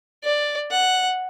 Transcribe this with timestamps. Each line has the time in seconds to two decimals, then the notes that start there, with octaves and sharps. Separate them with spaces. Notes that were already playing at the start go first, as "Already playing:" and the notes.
0.24 D5
0.71 F#5